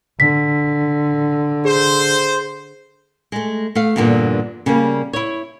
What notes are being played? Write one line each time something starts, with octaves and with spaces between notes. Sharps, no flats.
D3 B6
G#4 C5
G#3 A3
A3 F5
E2 G2 A#2 D3 E3
C#3 G3 A#3
E4 C#5